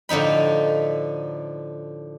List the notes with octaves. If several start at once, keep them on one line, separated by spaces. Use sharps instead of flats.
A2 D3 F3 D#4 B5